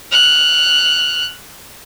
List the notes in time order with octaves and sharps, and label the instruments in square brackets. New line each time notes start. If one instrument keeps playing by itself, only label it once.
[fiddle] F6 F#6